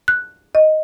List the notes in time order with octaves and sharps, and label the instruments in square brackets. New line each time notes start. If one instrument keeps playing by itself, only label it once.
[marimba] F#6
D#5